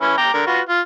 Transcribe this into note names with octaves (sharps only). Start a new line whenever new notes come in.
E3 C#4 E4
G5 A#5 D6
D3 A#4
F4 F#4 B4
F4